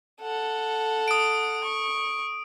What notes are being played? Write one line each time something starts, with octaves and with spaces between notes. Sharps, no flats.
A4 F#5
D#6 D7
C#6